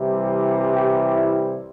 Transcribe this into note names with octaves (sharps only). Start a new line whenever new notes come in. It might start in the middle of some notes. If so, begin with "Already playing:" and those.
Already playing: C2 C3 E3 G3
G4
E4